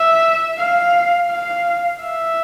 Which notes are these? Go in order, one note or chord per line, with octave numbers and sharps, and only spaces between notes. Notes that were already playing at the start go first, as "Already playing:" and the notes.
Already playing: E5
F5
F5
E5